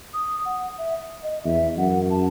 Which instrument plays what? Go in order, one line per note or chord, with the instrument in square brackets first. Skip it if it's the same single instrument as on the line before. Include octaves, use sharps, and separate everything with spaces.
[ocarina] D#6
F#5
E5
D#5
[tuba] E2 [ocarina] E5
[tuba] F#2 [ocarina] F#5
[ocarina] A5